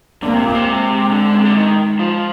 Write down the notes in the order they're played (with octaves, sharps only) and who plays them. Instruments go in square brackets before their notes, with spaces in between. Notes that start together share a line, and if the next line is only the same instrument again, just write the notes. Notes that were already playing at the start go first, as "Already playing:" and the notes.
[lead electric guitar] D3 [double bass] A#3
[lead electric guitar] C3
A#2
C3
[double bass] G#3
[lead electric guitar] D3
C3
D3
D#3
F3